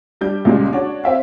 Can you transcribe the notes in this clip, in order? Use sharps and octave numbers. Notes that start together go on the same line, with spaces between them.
G3 D4 G6
C#2 A#2 G3 G#3
D4 F#4 C#5 D5
C4 E5 F5